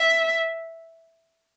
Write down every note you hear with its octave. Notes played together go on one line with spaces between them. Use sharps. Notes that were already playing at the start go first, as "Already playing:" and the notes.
Already playing: E5